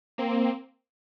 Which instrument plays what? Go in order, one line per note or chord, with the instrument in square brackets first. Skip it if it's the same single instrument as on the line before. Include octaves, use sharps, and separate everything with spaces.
[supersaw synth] A#3 C4